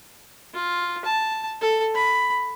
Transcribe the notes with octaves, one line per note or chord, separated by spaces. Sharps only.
F4
A5
A4
B5